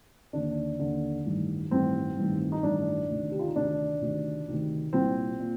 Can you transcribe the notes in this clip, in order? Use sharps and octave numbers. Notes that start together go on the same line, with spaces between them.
D#2 D3 D4
D#2 D3
A1 G2 D#3
A1 G2 D#3 C4
A1 G2 D#3
D#4
A1 G2 D#3 D4
D2 C3 D#3
G4
F4
D#4
D2 C3 D#3 D4
D2 C3 D#3
D2 C3 D#3
C2 A#2 C4
A#2